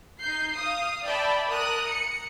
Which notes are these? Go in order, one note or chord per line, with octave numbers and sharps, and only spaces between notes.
D#4 G6 C7
F5 D#6
D5 E5 G5 A5 B5
A#4 D#6 F#6
C#7